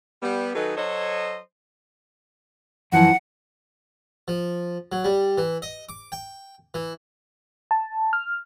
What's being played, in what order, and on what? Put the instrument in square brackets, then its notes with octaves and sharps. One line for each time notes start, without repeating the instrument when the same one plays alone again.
[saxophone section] G3 B3
D#3 F#3 D#4 G#4 A4 B4
F#3 A4 C5 C#5 D#5
[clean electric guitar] F#2 E3 F3 [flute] F#5
[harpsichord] F3
F#3
G3
E3
D#5
D6
G5
E3
[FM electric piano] A5
F6